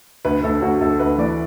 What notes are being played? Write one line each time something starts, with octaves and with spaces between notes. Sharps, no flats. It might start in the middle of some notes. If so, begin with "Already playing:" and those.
D2 B4
D2 A4
D2 F#4
D2 A4
D2 B4
E3 D5